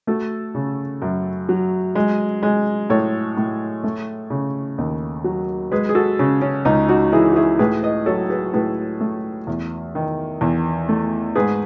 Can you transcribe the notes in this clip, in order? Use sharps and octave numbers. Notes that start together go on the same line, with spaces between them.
A3 F#4 A4
C#3
F#2
F#3
G#3
G#3
A2 A4 C#5
A2
A3
C#3
D#2
F#3
G#3 G#4 B4
G#4
F#4 A4
C#3 C#4
C#4
C#2 D#4
D#4 F#4
E3 E4 G#4
F#4
E4 G#4
A2 G#4 B4
B4 D#5
F#3 A4 C#5
G#4 B4
A2 G#4 B4
A3
E2
D#3
E2
A3
G#2 G#4 B4